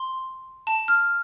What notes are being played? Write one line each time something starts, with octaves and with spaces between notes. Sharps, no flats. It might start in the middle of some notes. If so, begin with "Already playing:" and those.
Already playing: C6
A5
F6